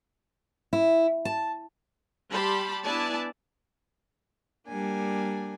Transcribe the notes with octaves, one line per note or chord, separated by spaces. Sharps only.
E4
A5
G3 G4 A5 B5 C6
B3 D4 E4 D5 G#5 A5
G3 A#3 D4 G#5